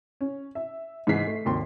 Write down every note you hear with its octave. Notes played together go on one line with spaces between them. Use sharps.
C#4
E5
G#2 E3 G#4 B6 C7
A3
G#1 D#2 C6